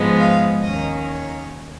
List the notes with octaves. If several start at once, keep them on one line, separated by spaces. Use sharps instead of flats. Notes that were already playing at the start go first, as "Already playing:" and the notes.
Already playing: G#2 F3 G#3 B3
F5
D#2 D#3 A#3 C#4 D#5
C#5